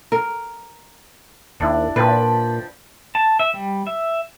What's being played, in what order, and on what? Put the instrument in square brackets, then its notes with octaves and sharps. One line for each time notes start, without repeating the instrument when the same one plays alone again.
[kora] A#4
[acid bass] D#2 [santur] D4 E4
[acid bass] A#2 [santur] F3 G5 B5 [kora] B4
[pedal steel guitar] A5
E5
G3
E5